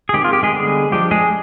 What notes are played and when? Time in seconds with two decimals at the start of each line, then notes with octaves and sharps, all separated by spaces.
0.09 G#4
0.13 D#3 G#3 C4 G4
0.24 F4
0.33 G4
0.43 G#3 G#4
0.53 D3 G3 B3
0.92 F3 G#3 D4 G4
1.11 G#3 G#4